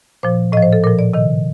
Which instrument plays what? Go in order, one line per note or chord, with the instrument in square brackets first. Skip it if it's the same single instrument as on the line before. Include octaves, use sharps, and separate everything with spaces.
[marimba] A#2 F3 C5
A2 D#5
F3
C5
A4
A#2 F3 A#4
D5
C3 D#3 D#5